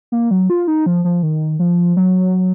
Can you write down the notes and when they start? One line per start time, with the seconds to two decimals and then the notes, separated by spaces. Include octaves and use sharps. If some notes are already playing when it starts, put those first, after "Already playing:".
0.12 A#3
0.31 F#3
0.50 F4
0.68 D#4
0.86 F3
1.05 F3
1.23 D#3
1.59 F3
1.97 F#3